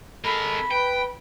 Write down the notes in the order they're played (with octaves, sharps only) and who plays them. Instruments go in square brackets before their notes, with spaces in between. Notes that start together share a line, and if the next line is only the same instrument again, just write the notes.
[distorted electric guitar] G#3 A#4 [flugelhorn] A4 [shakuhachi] B5
[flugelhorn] B4 [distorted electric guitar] G5